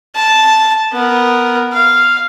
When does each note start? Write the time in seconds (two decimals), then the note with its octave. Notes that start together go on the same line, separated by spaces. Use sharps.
0.15 A5
0.92 B3 A#4
1.73 F5